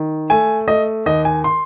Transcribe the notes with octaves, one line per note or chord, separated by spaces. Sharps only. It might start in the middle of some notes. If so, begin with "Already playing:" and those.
Already playing: D#3
A3 G#5
A3 D#5
D#2 D#5
G#5
C6